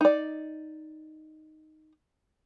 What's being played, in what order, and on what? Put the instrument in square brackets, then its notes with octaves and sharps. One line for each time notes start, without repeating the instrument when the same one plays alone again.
[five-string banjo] D#4 D5